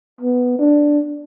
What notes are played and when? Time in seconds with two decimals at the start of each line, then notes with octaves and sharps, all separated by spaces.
0.21 B3
0.59 D4